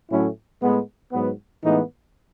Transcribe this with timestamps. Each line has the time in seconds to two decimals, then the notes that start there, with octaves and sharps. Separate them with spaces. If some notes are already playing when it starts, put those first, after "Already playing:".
0.10 A2 F#3 A3 C#4 E4
0.62 A2 G#3 B3
1.12 G#2 F#3 B3
1.63 A2 E3 G#3 B3 D#4